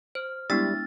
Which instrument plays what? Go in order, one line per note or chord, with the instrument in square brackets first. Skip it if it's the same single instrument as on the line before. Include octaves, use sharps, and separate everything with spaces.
[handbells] C5 [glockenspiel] F6
[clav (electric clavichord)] G3 [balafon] G#3 E4 [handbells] B3 D4 E6 [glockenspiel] A6